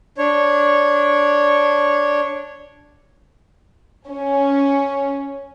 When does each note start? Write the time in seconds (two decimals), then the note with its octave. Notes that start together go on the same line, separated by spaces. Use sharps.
0.18 D4 C#5
4.09 C#4